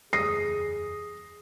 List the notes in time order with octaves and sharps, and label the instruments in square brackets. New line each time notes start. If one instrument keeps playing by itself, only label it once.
[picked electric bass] F#1 E2 [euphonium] G#4 [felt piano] D#6 A#6 C7